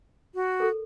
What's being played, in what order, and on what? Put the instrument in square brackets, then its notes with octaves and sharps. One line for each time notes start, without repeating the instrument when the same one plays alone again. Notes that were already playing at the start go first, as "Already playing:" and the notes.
[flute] F#4
[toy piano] A4 A#4